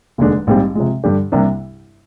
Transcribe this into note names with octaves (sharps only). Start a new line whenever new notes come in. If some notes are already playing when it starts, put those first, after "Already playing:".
F1 D#2 D3 G#3 D4
A#1 G#2 G3 C4 G4
C3 F3 G#3
G2 D3 G3 D4 G4
C2 C3 G3 A#3 D4